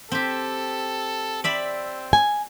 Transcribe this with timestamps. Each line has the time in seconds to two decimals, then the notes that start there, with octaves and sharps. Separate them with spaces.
0.12 C4 G4 A4
1.44 C4 D5 E5 B5
2.13 G#5